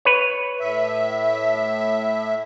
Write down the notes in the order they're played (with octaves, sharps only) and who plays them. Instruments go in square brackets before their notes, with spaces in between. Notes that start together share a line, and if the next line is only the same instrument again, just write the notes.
[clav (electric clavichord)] B4 C#5
[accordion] A2 E5